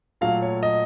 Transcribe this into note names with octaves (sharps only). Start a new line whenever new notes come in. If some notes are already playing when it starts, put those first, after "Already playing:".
A#2 F#3 A3 F5
C#5
D#5